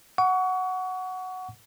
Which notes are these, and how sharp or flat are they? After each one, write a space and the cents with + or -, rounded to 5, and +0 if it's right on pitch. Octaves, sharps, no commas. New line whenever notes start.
F#5 +0 C#6 +30